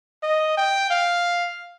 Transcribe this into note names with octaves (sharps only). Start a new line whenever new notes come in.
D#5
G5
F5